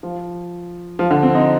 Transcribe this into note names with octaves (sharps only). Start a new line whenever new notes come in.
F3
F3
D3
C4
D#4